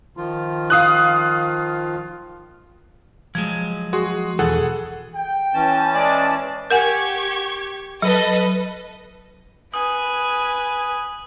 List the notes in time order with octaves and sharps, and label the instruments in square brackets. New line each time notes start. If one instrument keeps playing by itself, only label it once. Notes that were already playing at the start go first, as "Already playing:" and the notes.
[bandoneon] D#3 F3 F4
[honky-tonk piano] F5 D#6 F#6
[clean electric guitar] F3 F#3 G#3 [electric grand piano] G#6
[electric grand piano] F#4 G#4 C6
[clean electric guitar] B1 E2 E3 [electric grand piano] G#4 A4 F#5
[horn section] G5
[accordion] E3 C#4 A5
[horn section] G#3 D5
[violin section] G4 C#6 G#6 [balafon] A#4 F#5 G#5
[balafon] F#3 [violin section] A4 B4 D#5
[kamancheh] B4 G#5 [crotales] D#6